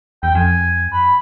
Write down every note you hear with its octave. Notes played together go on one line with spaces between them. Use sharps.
E2 G5
F2 G#5
B5